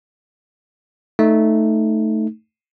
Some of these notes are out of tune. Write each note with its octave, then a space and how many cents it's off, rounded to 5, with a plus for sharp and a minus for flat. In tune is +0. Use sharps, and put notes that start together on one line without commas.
A3 +0 D#4 +0